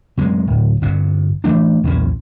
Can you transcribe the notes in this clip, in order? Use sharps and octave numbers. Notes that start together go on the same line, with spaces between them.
F#2 C3 G#3
D1
G1 G2 C3
E3 A3 D4
B1 E2 A#2 C#4